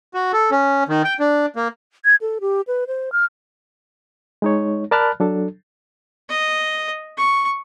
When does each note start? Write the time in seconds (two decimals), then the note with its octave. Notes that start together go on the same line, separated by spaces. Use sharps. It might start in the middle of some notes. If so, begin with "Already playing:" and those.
0.14 F#4
0.33 A4
0.51 C#4
0.88 D#3
1.05 G5
1.19 D4
1.56 A#3
2.05 G#6
2.21 A4
2.41 G4
2.67 B4
2.88 C5
3.12 F6
4.42 G#3 D#4 C#5
4.91 A#4 D5 A5 B5 F6 F#6
5.20 F#3 D4 A4
6.30 D#5
7.17 C#6